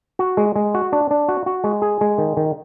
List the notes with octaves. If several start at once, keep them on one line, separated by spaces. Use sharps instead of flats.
F#4
G#3
G#3
F#4
D4
D4
F#4
F#4
G#3
G#4
G#3
D#3
D#3